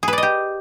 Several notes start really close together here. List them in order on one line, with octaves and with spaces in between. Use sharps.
G#4 B4 D5 D#5 G4